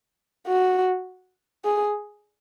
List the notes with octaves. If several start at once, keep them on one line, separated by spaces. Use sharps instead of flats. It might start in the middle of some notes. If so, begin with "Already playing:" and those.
F#4
G#4